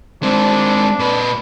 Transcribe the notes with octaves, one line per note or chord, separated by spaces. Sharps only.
G#3 C4 D4
A#2 B4